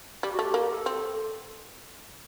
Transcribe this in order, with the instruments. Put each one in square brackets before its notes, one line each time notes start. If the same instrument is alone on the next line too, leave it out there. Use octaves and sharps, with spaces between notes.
[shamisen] G3 [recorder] G4
[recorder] F#4
[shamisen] A3 [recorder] G4
[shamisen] A#3
[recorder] A4
[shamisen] C4